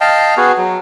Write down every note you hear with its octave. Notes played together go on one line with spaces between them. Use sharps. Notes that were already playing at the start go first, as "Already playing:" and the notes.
D#5 F5 G5 A5
B3 F#4 G#4
F#3